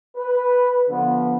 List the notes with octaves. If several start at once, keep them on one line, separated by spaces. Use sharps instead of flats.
B4
D3 F3 B3